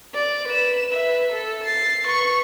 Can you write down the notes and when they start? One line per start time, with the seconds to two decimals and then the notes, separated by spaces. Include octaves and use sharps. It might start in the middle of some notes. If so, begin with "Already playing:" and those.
0.14 D5
0.47 B4 E7
0.90 B4 E5
1.31 A4
1.63 A6 C7
2.06 B4 C#6